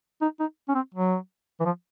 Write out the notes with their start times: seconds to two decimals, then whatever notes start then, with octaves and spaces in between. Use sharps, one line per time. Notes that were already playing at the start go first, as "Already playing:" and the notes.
0.22 D#4
0.40 D#4
0.68 C#4
0.75 C4
0.94 F#3
1.60 E3
1.65 F3